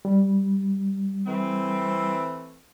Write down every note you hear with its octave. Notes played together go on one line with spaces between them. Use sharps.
G3
E3 A3 C4